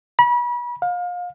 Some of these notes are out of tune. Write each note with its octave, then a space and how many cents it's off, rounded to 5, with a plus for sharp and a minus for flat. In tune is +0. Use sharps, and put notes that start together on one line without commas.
B5 -35
F5 +30